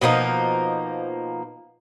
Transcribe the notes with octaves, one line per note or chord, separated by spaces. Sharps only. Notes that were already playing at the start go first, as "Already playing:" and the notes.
B2 F3 A#3 D#4